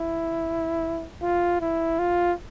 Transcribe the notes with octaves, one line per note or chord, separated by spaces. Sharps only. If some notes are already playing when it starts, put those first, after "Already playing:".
Already playing: E4
F4
E4
F4